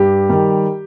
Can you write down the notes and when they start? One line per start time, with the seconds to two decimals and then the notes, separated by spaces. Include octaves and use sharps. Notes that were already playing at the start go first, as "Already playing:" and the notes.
Already playing: G2 G4
0.30 D#3 G3